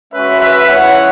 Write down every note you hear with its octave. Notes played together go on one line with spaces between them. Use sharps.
G#3 C#4 F#4 B4 E5
B4 E5
G#3 C#4 E4 C#5 F#5